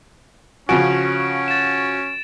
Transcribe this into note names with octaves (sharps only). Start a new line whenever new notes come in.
C#3 F3 C#4 F#4 G#5 D7
A6 E7